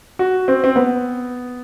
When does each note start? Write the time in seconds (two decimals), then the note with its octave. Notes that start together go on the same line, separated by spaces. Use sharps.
0.19 F#4
0.48 C4
0.64 C4
0.76 B3